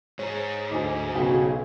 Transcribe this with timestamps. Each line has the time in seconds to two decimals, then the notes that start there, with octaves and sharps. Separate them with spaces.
0.19 G#2 C#5 A#5
0.71 D2 D#4 G#5 D6
1.15 B1 C#3 F#4 G5 G#5